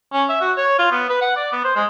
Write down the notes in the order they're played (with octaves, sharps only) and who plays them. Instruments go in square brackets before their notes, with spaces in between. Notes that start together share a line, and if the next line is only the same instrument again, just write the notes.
[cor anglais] C#4
E5
F#4
C#5
F4
B3
B4
F#5
D5
B3
C5
G#3